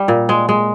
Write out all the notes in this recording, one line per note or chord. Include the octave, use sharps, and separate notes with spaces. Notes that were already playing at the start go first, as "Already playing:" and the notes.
Already playing: G3
A#2
G#3
G#3